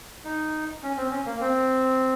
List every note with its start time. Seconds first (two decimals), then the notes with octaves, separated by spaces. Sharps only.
0.25 D#4
0.83 C#4
0.97 C4
1.11 C#4
1.26 A#3
1.41 C4